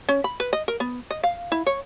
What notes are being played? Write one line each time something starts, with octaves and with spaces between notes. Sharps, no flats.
C#4
B5
B4
D#5
A#4
B3
D#5
F5
E4
C#5